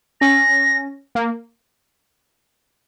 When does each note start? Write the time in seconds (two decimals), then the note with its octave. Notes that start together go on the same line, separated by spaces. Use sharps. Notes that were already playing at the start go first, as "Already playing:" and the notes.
0.21 C#4 A#6
1.15 A#3